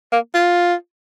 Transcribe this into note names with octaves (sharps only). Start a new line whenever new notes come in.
A#3
F4